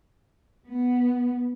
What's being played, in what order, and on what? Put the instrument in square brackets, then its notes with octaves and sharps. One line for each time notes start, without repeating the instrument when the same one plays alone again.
[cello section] B3